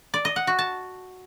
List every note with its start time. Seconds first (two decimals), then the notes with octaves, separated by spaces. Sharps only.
0.14 D5
0.25 D#5
0.36 F#5
0.47 F#4
0.59 A5